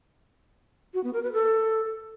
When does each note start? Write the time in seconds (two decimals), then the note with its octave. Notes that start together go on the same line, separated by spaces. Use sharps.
0.94 F#4
1.04 B3
1.14 A#4
1.23 B4
1.33 A4